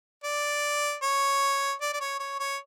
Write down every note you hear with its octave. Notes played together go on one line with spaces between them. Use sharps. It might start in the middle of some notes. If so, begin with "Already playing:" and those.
D5
C#5
D5
D5
C#5
C#5
C#5